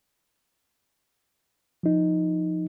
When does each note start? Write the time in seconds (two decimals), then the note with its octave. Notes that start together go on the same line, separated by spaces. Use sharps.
1.83 F3 D#4